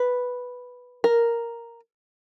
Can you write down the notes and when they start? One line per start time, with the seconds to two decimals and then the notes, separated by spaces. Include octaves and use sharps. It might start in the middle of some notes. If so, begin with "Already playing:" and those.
Already playing: B4
1.04 A#4